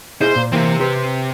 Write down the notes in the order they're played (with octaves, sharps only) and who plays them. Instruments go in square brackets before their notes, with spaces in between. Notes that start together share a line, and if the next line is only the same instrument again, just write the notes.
[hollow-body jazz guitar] E4 G#4 D#5 [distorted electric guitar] C5
[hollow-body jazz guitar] A#2
[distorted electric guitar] C3 C4 [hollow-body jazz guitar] E3 A#3
[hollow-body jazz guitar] G4 B4 C5